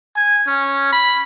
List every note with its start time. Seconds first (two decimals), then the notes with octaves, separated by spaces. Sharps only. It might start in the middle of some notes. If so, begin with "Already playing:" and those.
0.16 G#5
0.47 C#4
0.92 B5